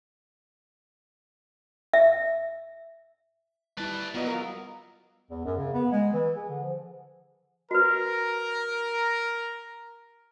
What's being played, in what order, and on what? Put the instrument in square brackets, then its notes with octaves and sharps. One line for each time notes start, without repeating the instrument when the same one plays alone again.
[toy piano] E5
[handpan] G3 E4 [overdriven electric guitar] B4 A5
[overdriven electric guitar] F#3 [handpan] B3 [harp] F4 B4 D#5
[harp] A#4 F5
[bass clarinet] E2
F#2
C#3
B3
G#3
E3
G#4
D3
F3
[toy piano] F#4 B4 [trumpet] A#4